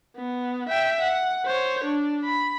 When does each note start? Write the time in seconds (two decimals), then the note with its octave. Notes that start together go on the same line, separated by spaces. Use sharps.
0.16 B3
0.69 E5 G5
1.01 F#5
1.46 C5 C#5
1.85 D4
2.25 B5